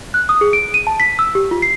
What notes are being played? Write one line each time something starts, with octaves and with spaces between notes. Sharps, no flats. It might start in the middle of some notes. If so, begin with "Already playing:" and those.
F#6
D#6
G#4
D7
D#7
A5
B6
E6
G4
F4
C7